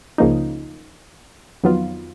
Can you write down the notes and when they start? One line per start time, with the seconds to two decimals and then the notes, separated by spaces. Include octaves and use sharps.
0.18 C#2 C#3 F3 A#3 D#4
1.63 F2 D#3 F#3 B3 F4